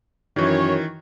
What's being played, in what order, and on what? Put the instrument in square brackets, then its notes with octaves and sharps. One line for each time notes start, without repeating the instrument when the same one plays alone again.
[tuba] F#2 [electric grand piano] D#3 E3 [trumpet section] C#5